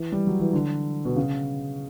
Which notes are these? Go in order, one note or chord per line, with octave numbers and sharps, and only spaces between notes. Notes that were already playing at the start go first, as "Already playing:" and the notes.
Already playing: E3
G3
F#3
E3
D3
B2
C#3